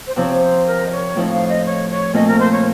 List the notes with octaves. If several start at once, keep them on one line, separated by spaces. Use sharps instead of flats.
C5
C3 F3 C4 C#5
C5
A#4
D#5
C#5
A2 F3 C4 D#4
F5
D#5
C#5
C#5
A#2 A3 C4 F4 D#5
A#4
C5
C#5